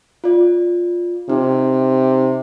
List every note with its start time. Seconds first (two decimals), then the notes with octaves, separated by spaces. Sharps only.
0.24 F4 D5
1.30 C3 D#4